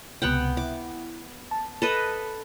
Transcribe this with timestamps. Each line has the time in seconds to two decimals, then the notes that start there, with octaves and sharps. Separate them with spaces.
0.22 C#2 C3 B3 F#5 G5
0.57 E4 D6
1.51 A5
1.82 A4 B4 D#5